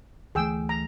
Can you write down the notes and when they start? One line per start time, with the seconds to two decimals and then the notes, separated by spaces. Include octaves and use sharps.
0.35 D2 E3 A3 G#4 G5 E6
0.69 A#5